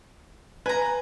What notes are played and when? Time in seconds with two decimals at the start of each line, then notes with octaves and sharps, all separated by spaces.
0.66 B4 G#5 A#5